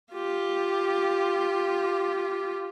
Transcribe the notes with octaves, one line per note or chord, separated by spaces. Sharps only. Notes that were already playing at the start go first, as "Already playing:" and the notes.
F4 G4